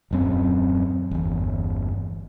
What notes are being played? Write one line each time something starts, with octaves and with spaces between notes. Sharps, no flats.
D#1 F#2 C4
G1 E2